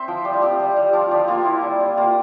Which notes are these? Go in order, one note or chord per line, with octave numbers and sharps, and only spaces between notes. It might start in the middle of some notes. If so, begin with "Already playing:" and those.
Already playing: C4 C5 E5
F3
G3 G4
F4
C4 G4
G3
G3
F3 F4
F3 G4
A#3 F4
E4
G3
G3
A#3 F4